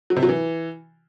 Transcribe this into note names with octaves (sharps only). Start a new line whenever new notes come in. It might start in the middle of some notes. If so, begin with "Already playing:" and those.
F#3
C3
F#3
E3